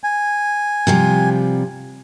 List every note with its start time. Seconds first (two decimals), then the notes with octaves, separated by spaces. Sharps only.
0.04 G#5
0.87 C3 F3 G3